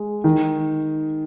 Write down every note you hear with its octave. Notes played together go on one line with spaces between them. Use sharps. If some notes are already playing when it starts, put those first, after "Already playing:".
Already playing: G#3
D#3